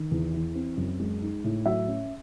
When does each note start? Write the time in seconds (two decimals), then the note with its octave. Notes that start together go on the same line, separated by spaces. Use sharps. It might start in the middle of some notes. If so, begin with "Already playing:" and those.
Already playing: D#3
0.11 E2
0.33 E3
0.55 C4
0.77 F#2
1.00 G#3
1.22 D#4
1.44 A2
1.66 F#3 E5
1.88 C#4